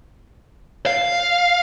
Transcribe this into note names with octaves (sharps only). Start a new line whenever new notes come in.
F5